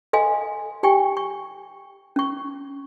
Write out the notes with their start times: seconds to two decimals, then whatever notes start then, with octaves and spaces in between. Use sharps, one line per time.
0.13 A4 D#5 F5 G#5 C6
0.83 G4 G5 G#5 C#6
1.17 C#6
2.16 C#4 C#6